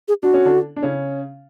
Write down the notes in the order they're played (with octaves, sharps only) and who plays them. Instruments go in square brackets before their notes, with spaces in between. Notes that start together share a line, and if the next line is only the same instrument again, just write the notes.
[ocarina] G#4
[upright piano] D4 [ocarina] F#4
[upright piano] C#4
D3 D4
D4
C#3 C#4